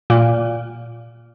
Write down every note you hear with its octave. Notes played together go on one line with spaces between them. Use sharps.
A#2